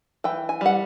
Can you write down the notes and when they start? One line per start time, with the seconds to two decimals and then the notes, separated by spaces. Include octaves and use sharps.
0.24 E3 G5
0.49 G#5
0.61 G3 F#5